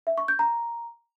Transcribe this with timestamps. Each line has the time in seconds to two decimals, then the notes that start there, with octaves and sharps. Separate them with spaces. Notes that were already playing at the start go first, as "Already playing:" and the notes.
0.07 E5
0.18 C#6
0.28 G6
0.39 A#5